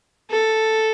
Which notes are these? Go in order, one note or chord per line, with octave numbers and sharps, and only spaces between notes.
A4